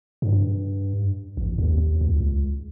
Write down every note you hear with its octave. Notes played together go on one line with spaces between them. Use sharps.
G2
A1
D#2
C#2